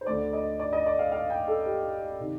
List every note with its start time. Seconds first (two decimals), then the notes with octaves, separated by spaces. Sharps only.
0.01 C5
0.07 D2 D3 A3 D5
0.33 D#5
0.60 D5
0.73 D#5
0.86 D5
0.99 F5
1.12 F5
1.30 G5
1.48 A4
1.65 G4
2.20 C3 D#3